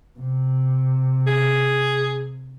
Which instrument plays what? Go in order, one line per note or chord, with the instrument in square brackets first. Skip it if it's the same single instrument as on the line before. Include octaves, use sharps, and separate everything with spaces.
[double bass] C3
[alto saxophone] G#4